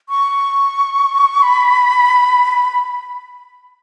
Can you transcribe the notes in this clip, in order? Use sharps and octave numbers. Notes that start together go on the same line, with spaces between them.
C#6
B5